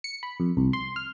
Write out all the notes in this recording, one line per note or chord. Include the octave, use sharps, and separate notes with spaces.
C#7
B5
F2
C2
C6
F6